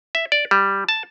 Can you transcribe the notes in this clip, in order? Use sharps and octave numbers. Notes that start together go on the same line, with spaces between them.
E5
D5
G3
A5